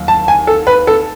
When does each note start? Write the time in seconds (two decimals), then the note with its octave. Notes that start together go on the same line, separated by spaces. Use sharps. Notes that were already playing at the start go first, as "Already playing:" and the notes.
Already playing: D#2 F#3
0.08 A5
0.28 G#5
0.47 A4
0.67 B4
0.87 A4